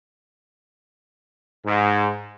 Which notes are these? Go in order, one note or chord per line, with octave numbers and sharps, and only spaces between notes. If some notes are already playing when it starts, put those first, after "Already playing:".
G#2